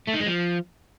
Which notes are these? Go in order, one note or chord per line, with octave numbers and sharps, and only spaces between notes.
A3
D#3
G#3
F3